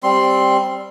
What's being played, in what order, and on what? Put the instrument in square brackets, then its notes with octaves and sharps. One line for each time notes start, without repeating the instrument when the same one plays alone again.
[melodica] G3 C4 C6